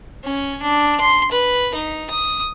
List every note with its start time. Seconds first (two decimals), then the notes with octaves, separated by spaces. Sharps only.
0.24 C#4
0.62 D4
1.00 C6
1.32 B4
1.75 D#4
2.10 D#6